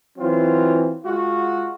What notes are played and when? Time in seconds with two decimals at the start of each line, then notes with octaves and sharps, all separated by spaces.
0.17 E3 F#3 C4 F4
1.04 G#3 F4 F#4